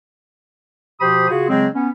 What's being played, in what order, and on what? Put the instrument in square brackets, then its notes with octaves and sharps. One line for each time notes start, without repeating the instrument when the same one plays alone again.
[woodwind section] B2 F3 G4 C5 B5 D#6
C#3 F4 F#4 G#4
C#3 F#3 G#3 C4
B3 C#4